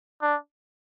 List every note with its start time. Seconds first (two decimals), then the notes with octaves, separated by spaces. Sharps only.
0.22 D4